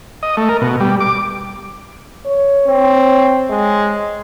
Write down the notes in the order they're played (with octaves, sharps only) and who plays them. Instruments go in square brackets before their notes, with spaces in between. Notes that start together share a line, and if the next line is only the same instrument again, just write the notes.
[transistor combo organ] D#5
A3
A#4
B2
G3
D6
[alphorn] C#5
[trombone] C4
G#3